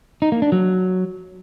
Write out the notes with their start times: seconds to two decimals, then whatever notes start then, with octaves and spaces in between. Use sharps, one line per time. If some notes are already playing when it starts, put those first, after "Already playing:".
0.22 D#4
0.32 A#3
0.42 D4
0.52 F#3